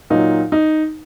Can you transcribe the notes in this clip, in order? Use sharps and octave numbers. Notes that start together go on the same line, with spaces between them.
A#2 F#3 D#4
D#4